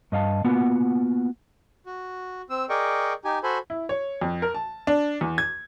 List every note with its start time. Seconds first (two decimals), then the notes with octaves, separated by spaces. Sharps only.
0.12 G2 D#5 F5 A5
0.44 A#3 B3 F4 F#4 F#5
1.86 F#4
2.50 C4 E6
2.69 G#4 A#4 D5 D#5 G5 C#6
3.25 D#4 G4 G#5
3.43 F#4 A4 C5 G#5 B5
3.70 E4
3.89 C#5
4.21 F2
4.42 A#4
4.54 A5
4.87 D4
5.21 E2
5.38 G#6